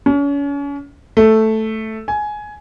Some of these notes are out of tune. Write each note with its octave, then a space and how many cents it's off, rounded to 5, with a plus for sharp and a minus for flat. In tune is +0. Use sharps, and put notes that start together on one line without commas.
C#4 +35
A3 +0
G#5 +15